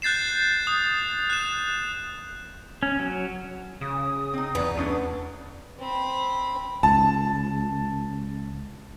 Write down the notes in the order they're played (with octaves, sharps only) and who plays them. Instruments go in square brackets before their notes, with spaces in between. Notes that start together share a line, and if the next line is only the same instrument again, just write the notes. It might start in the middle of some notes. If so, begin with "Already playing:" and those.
[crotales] F#6 G6 A6 C7 E7
D#6
F#6 E7
[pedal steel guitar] C#4
F#3
[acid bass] C#3 [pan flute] D#6
[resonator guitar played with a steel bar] C4 D#4
[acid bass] E2 [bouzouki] B3 [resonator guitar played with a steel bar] D5 A#5
[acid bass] E2 [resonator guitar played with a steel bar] A3 C#4 D4
[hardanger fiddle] C4 B5
[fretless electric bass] C#2 [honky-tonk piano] A5